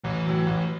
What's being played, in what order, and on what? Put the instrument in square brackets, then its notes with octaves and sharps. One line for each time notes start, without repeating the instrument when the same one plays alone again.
[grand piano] A1 [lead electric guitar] E3
[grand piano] A2 F#3
A1